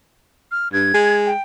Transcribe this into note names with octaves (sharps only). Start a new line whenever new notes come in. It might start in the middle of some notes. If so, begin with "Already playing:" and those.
F6
G2 G#6
G#3
G5